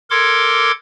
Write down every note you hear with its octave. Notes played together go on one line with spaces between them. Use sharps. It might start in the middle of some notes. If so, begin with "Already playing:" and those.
A4 A#4 C6 D6 G#6